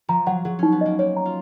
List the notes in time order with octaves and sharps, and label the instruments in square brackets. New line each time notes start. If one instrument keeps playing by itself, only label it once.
[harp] F3 [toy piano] A#5
[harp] F#3 [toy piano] F#5
[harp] F#3 [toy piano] G#4
[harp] C#4 [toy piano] D#4
[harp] B3
[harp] A#3 [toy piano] D#5
[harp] A#3 [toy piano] C#5
[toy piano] A#5
[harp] F4